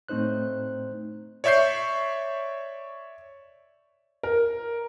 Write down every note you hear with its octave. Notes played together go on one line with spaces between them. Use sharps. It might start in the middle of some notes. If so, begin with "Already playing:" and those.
A2 A3 C4 D#4 C5 F#6
C#5 D5 E5 C#6 G6 C7
A#4